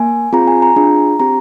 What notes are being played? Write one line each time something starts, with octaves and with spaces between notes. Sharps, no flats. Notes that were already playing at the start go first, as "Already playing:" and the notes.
Already playing: A#3 G#5
C4 F4 G#4 A#5
G#5
A#5
D4 F4 G#4 A#5
C4 G4 A#5